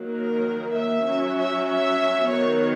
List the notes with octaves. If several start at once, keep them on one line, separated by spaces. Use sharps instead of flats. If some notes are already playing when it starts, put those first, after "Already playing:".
Already playing: D#3 F#3 A#3
A#4
E5
F#3 C#4
E5
E5
D#3 F#3 B3 C#5